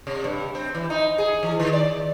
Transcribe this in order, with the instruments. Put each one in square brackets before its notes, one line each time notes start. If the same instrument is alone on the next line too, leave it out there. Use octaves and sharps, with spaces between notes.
[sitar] C3
G2
C4
E3
D#4
G#4
E3
D#3
D5